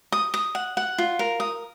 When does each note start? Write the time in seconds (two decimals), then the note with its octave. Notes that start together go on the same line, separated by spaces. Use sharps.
0.12 D#6
0.34 D#6
0.55 F#5
0.77 F#5
0.98 F4
1.19 A#4
1.40 D#6